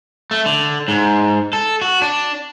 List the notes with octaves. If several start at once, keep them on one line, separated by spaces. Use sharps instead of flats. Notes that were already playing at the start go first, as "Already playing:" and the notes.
A3
D3
G#2
A4
F#4
D4